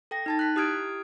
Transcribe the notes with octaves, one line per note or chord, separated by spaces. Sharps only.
A4 G5 A#6
D#4 A5 A6
F#6 B6
E4 G4 D#6 F6 G#6 D7